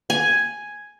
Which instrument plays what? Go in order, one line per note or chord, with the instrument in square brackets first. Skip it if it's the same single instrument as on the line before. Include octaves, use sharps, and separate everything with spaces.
[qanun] G#5